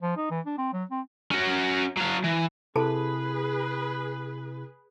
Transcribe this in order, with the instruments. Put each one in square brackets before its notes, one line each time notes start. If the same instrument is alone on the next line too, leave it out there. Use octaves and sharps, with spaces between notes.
[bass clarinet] F3
D#4
E3
D4
C4
F#3
C4
[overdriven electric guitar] C#4 F#4
F#3 F5
E3
[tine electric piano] C3 E4 [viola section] G#4 B4 [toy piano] A4 A5